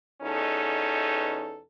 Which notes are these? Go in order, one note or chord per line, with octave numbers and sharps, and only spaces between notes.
E2 B2 C#4 D#4 A4